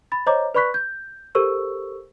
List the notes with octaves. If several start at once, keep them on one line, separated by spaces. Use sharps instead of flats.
B5 A6
C5 C#5 D#5 A#5 D6
B4 D5 B5 C#6 F#6 B6
G6
G4 A4 A#4 C5 C#6 E6